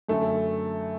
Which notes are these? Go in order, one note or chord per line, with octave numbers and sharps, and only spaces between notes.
F#2 D3 A3